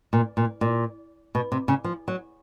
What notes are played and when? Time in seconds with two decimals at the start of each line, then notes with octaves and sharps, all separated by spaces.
0.13 A#2
0.37 A#2
0.61 A#2
1.35 B2
1.52 C3
1.68 C#3
1.84 F3
2.08 F#3